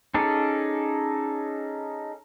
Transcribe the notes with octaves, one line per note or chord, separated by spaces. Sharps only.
C#4 D#4 G#4 A4 D5